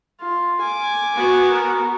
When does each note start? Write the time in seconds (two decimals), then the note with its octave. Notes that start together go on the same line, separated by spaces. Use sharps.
0.20 F4
0.61 G#5 D6
1.15 B3 F#4
1.51 A#4